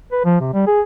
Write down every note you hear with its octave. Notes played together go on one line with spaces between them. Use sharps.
B4
F3
C3
G3
G#4